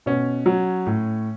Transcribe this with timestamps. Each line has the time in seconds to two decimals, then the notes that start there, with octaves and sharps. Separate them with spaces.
0.06 B2 C#4
0.46 F#3
0.86 A2